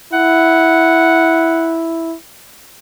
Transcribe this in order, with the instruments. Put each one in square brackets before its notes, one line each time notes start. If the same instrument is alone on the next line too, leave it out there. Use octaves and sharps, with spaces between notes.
[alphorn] E4 [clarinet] F#5